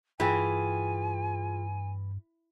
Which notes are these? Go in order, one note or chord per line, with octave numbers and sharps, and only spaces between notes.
G2 E3 F4 G#4 G5 G#5